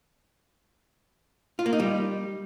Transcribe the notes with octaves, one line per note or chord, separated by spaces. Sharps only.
F4
A#3
D#4
G3